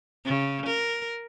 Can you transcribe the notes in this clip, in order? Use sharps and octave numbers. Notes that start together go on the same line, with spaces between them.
C#3
A#4